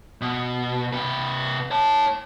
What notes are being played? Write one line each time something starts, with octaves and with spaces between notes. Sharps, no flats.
B2
C3 B4
C#5 A5